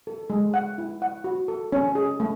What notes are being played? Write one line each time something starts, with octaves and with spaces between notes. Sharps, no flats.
A4
G#3
F#5
E4
F#5
F#4
A4
C#4
G#4
A3